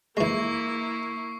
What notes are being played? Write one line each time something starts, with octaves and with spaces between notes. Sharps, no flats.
E3 G#3 A#3 E4 C#6 C7